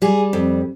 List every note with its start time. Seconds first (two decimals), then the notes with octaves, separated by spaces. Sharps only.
0.02 G3 G#4
0.33 F2